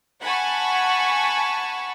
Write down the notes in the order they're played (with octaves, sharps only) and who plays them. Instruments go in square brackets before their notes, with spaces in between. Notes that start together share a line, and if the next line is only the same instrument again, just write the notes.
[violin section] F#5 G#5 A5 B5 C#6